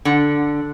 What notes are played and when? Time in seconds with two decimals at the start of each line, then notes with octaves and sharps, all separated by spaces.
0.05 D3